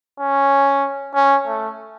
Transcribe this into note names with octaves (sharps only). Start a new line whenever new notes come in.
C#4
C#4
A3